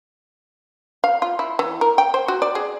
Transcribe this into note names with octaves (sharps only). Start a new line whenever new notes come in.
F5
F4
E4
E3
A#4
G5
C5
F#4
D5
G#4